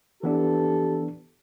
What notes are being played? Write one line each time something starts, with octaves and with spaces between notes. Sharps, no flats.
E3 B3 D4 G4 A4